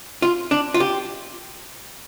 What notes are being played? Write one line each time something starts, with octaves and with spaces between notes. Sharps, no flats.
F4
D4
F4
G4